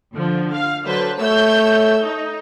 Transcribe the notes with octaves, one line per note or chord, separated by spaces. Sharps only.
D3 F3
F5
D3 F#3 B4 C5
A3 C#5 E6 G6
D#4